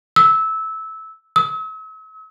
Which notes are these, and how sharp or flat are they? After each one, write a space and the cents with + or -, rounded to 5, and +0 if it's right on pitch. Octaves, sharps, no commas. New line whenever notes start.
E6 -15
E6 -40